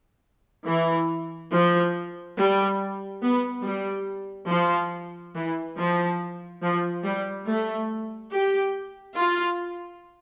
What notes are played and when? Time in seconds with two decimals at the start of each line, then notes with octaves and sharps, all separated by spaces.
0.66 E3
1.52 F3
2.37 G3
3.22 B3
3.64 G3
4.49 F3
5.35 E3
5.76 F3
6.62 F3
7.05 G3
7.46 A3
8.33 G4
9.17 F4